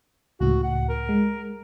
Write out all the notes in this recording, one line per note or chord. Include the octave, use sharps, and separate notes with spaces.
C#2 A2 F#4
F#5
A#4
G#3